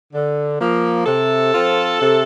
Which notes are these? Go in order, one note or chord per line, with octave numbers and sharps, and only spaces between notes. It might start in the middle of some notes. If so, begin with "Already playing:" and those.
D3
F3 A#3
C3 A4
F3 C4 F4
C3